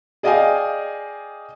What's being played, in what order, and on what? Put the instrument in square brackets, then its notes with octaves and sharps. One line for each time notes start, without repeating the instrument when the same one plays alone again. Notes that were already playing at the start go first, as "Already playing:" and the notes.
[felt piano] G#4 D5 D#5 F5 G5 G#5